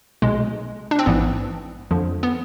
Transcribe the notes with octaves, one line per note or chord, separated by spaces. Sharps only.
B1 B2 G#3
D4
C4
A1 G#2 E3 B3
F2 D3 F3
B3